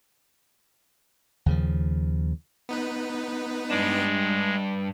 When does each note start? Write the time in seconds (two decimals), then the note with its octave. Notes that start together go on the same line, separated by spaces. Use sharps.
1.46 D#2 C#3 F3
2.69 B3 D#4 B4
3.70 G2 G#3 D4